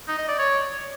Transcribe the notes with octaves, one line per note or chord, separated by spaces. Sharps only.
D#4
D#5
D5
C#5